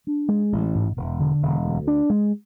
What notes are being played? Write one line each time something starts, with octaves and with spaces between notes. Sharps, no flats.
D4
G#3
A1
G#2
E1
D3
E1
D2
D4
G#3